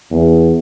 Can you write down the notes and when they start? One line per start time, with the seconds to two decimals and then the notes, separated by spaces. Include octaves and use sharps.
0.11 E2